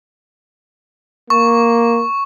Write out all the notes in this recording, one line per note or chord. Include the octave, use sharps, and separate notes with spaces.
A#3 C#6